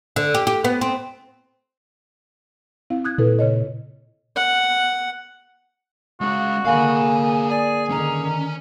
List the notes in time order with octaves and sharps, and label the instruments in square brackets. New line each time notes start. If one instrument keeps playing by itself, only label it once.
[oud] D3
G4
G4
B3
C4
[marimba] C4 E4 F5
D#6 F#6 G#6
[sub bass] A#2 [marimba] E4 A4 B4
[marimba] C#3 C#5 D#5
[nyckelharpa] F#5
[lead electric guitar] G#3 C#4 [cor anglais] F#4
[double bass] D3 A#3 [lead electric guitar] G#4 F5 [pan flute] G#5
[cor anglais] G#4 [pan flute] D5 [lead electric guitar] G#5
[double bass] D3 D#3 [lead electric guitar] C#4 [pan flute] A#5